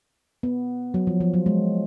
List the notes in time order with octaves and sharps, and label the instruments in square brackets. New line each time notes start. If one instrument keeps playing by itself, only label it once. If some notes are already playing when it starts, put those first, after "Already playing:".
[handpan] B3
F#3
F3
F3
F#3
G#3